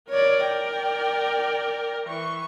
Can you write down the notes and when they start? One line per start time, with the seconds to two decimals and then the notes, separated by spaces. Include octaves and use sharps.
0.10 A#4 C#5 D5
0.48 D5 G5
2.06 E3 C#6